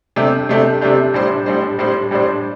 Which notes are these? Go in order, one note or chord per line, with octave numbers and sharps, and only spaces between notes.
C3 A3 D4 G4
C3 A3 D4 G4
C3 A3 D4 G4
A2 G3 D4 C5
A2 G3 D4 C5
A2 G3 D4 C5
A2 G3 D4 C5